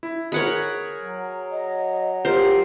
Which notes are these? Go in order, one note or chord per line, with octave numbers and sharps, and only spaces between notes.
E4
G#4 A#4 C#5 F#5 B5
F#3
D#5
F4 G4 A#4 C5